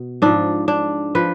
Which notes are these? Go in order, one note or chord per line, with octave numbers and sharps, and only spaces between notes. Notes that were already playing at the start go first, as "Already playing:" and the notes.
Already playing: B2
G#2 F3 D4
D4
F3 B4